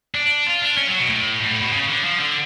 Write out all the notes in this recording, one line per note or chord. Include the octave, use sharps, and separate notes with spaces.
D4
F4
D4
C#4
F#3
B2
A2
G#2
A2
B2
C#3
D3
F3
D3